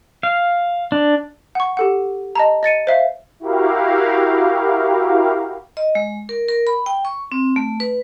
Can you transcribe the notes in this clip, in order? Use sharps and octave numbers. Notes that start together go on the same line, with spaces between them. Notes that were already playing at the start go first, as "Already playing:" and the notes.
F5
D4
F#5 C#6
G4 A4 F#5
D#5 A5 A#5
D#5 A6 C#7 D#7
C5 E5 F5
E4 F#4 G4 A#4 F5
D#5
G#3
A#4
A#4
B5
G5
C#6
C4
A3
B4